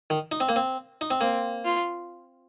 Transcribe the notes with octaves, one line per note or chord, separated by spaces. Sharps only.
D#3
D#4
C4
A#3
C4
D#4
C4
A#3 C4
F4